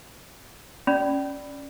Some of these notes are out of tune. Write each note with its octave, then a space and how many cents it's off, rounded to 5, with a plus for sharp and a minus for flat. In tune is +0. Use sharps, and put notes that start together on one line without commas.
C#4 +0 D5 +0 B5 +0